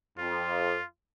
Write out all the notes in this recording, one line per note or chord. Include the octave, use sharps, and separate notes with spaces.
F2 F4